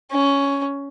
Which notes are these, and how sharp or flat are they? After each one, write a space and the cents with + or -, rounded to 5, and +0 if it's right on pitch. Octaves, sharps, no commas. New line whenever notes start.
C#4 +10